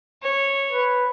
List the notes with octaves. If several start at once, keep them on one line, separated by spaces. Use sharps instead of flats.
C#5
B4